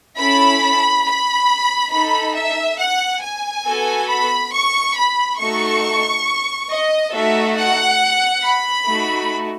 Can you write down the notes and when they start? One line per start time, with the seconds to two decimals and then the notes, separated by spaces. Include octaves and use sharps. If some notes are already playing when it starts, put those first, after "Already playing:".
0.17 C#4 E4 A4 B5
1.05 B5
1.91 D#4 A4 B5
2.35 E5
2.78 F#5
3.22 G#5
3.66 B3 F#4 A4
4.09 B5
4.53 C#6
4.96 B5
5.39 A3 D#4 F#4 A4 C#6
6.69 D#5
7.13 A3 D#4 F#4 A4 E5
7.57 F#5
8.43 B5
8.87 A3 D#4 F#4